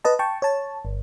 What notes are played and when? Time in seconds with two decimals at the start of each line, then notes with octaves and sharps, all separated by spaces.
0.04 B4 D#5 A5
0.19 G5 A5 C#6
0.42 C#5 A5
0.85 G1